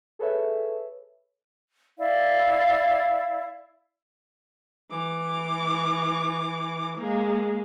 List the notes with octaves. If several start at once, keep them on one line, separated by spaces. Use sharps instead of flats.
G#4 A4 B4 C#5 E5
E4 D5 F5
E3 D6
G#3 A#3